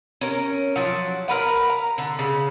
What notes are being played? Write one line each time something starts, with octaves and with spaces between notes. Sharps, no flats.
C#4 A#4
F3 F#3
A#4 B4 F#5
A#5
D3
C#3